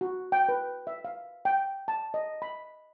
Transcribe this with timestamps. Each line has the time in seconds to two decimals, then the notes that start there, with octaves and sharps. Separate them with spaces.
0.01 F#4
0.32 G5
0.49 B4
0.87 E5
1.05 F5
1.45 G5
1.88 A5
2.14 D#5
2.42 B5